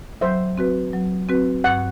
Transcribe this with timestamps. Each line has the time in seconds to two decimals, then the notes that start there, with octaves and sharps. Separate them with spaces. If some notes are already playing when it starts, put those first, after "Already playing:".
0.21 F#3 C5 E5
0.58 C4 F#4 B4
0.93 F#3
1.29 C4 F#4 B4
1.64 G2 F#5